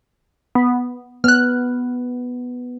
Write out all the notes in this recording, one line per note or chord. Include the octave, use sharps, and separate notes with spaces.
B3
B3 F6 F#6